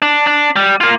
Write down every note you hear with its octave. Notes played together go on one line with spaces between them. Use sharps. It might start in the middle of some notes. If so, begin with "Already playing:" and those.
D4
D4
G3
A#3 F4